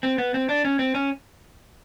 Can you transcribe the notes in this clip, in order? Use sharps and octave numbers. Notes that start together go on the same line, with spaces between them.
C4
B3
C4
D4
C#4
C4
C#4